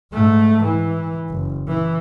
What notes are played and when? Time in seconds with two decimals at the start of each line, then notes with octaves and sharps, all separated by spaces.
0.13 G#2 A3
0.64 E3
1.30 F#1
1.68 E3